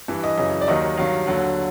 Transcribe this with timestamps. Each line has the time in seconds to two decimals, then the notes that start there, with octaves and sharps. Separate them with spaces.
0.08 G2 E3
0.24 D#5
0.38 F#2 C#3 E3 D#5
0.61 D5
0.68 D#2 D#3 F#3 D#5
0.97 G2 D#3 F#3 F5
1.27 D#2 D3 F#3